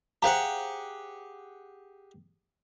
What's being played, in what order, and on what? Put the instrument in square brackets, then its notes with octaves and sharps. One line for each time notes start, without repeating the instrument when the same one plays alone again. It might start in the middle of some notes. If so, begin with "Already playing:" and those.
[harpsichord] G4 G#4 F#5 [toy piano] C5 F5 A#5